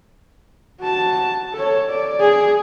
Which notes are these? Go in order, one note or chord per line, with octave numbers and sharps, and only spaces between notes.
F#4 A5
A4 C#5
D5
G#4